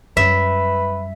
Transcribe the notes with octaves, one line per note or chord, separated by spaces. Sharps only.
F#2 G3 B4 E5